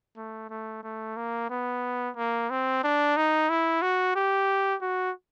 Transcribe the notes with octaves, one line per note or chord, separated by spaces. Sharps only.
A3
A3
A3
A#3
B3
A#3
C4
D4
D#4
E4
F#4
G4
F#4